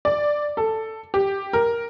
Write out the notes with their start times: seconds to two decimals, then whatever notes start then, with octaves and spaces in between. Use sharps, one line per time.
0.05 D5
0.57 A4
1.14 G4
1.53 A#4